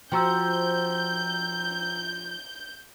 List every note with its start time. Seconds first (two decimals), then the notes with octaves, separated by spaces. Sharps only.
0.12 F3 F#4 G5 A#5 E6 G6